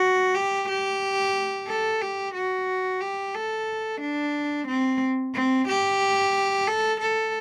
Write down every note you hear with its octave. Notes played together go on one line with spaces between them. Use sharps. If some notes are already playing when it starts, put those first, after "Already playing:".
Already playing: F#4
G4
G4
A4
G4
F#4
G4
A4
D4
C4
C4
G4
A4
A4